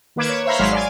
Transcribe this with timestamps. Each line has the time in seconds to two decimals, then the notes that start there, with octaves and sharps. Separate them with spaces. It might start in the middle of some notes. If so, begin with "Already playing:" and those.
0.16 D#3 A#3 B4 D6 G#6 E7
0.29 C#5
0.45 C5 C#5 E5 F5 A#5 B5
0.59 G#1 F#3 G#3 F5 C6 F6
0.72 D5 G#5